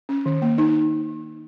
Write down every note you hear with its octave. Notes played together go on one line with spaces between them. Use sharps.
C#4
D#3
A#3
D#4